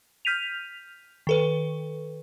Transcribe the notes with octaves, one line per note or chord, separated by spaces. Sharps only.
F6 G6 B6 D#7 F7
D#3 A4 B4